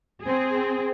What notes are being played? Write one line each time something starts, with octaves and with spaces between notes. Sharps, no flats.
C4 G#4